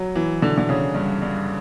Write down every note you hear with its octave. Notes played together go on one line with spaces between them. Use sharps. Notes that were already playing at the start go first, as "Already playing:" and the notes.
Already playing: F#3
E3
D3
D3
C#3
G2
G2